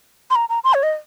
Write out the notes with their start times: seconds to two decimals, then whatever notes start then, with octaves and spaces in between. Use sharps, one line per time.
0.31 C6
0.35 A#5
0.49 A#5
0.64 C6
0.74 C#5
0.83 D#5